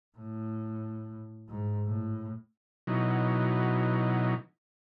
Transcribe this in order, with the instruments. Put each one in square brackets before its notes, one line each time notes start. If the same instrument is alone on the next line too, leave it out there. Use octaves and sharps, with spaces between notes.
[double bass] A2
G#2
A2
[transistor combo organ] B2 E3 F#3 D#4